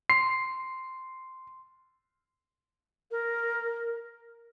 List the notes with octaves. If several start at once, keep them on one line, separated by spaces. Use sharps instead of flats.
C6 C7
A#4